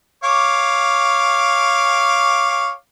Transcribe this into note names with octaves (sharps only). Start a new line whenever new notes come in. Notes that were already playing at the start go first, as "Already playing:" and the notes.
C#5 F5 D6